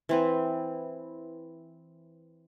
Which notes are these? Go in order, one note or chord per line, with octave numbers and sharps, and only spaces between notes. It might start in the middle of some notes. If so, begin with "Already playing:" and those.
E3 C4 B4